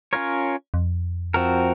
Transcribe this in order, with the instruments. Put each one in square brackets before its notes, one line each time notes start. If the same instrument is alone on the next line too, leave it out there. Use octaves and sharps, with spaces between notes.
[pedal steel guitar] C#4 F4 A#4 C#5
[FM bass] F2
[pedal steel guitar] F3 C4 F#4 A#4